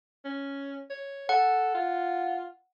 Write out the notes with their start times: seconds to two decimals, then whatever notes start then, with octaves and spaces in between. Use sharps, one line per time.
0.25 C#4
0.90 C#5
1.29 A4 F#5
1.74 F4